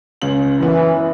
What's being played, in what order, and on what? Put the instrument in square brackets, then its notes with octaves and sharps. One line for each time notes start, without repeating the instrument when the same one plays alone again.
[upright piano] C#2 C#3 F#7
[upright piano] F#2 B3 [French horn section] E3